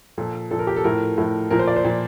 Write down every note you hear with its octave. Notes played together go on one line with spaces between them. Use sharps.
A#2 F3 A4
A#2 F3 A4
A#4
G4
A4
A2 F3 A#4
A2 F3
A#2 F3 A#4
C5
D5
C5
A#2 F3